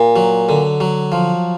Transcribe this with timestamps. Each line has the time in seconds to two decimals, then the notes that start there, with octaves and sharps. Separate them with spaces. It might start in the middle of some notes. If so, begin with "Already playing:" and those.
Already playing: A#2
0.16 F#3
0.49 D3
0.80 F#3
1.12 F3